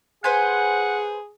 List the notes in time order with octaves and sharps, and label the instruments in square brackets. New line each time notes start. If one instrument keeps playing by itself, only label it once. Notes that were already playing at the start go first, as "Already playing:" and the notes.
[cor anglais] G#4 [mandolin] B4 C5 G#5 [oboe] F#5